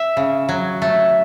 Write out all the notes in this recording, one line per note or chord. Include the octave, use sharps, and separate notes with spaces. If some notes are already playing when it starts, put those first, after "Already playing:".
Already playing: E5
C#3
F#3
A3